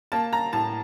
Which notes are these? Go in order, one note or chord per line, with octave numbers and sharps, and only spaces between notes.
A#3 A5
A#5
A2 A5